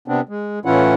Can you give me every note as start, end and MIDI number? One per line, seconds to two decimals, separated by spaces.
0.08 0.21 48
0.08 0.21 59
0.08 0.21 60
0.08 0.21 62
0.29 0.59 56
0.65 0.94 45
0.65 0.94 52
0.65 0.94 61
0.65 0.94 64
0.65 0.94 65
0.65 0.94 78